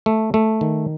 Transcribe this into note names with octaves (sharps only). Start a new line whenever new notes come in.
A3
A3
D#3